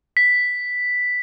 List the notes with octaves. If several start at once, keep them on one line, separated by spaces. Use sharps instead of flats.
B6